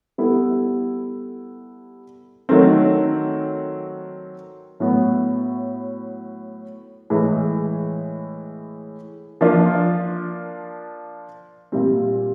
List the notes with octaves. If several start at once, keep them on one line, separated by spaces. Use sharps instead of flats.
G3 B3 E4 A4
D#3 F#3 A3 C4
A2 F#3 B3
A2 E3 G#3
F3 A#3 D4 F4
A#2 G3 C4